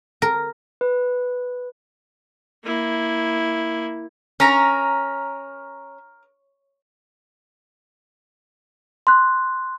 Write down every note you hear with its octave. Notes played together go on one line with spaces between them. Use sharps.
A#4
B4
A#3 E4
C#4 A#4 A#5
C6 F#6